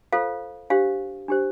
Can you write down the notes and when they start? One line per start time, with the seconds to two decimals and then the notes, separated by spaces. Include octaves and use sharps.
0.13 F4 A4 C5 F5
0.70 D4 G4 C5 F5
1.28 D4 G4 C5